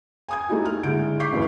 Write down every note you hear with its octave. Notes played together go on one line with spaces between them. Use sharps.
G#5 D#6 G#6
A3 A#3 D#4 E4 F#4
F6
A2 D3 G#3 G6 D7
C#6 D6 G6 B6 C7
E1 C#2 F#2 A2 C#3